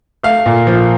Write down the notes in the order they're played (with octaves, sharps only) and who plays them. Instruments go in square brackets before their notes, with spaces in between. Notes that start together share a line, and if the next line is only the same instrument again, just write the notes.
[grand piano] A3 F5
A#2
F3